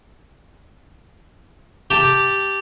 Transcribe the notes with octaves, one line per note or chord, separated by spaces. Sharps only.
G4 A5